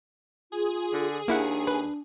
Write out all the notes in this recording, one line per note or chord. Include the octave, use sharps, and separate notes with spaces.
F4 G#4
D3
D#2 A#3 D4 E4 F#5
B4